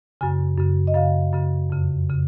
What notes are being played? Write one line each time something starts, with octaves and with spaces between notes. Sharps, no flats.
F#2 C#3 G#5
F#2 C#3
D#5
F#2 C#3 F5
F#2 C#3
F2 C#3
C#3